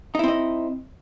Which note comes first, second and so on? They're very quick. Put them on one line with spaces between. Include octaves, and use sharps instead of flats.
D#4 E4 C4 D#5